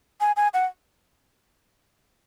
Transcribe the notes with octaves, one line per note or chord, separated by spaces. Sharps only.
G#5
G#5
F#5